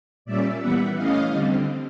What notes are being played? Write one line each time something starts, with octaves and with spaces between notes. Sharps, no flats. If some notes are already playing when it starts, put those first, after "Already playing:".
A#2 G3 A#3 C#4 D5 E5
E3 G3 B3 E5 F#5
E3 A3 C#4 D#5 F5
D3 G3 C4